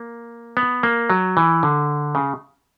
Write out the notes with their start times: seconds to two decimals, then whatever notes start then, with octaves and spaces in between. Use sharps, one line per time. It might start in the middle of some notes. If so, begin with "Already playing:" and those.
Already playing: A#3
0.57 B3
0.83 A#3
1.10 F#3
1.37 E3
1.63 D3
2.15 C#3